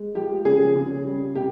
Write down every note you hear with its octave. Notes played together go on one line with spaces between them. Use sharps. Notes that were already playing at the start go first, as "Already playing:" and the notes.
Already playing: G#3
F3 G4
C#3 G#4
C#3
G3
C3 G4